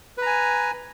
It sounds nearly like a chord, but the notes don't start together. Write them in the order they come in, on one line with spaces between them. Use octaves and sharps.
B4 A#5 G#5